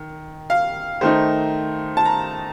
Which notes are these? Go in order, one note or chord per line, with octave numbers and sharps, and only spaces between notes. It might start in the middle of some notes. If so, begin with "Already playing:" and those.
Already playing: D#3
F5
D#3 A3 D#4 C5
A5
A#5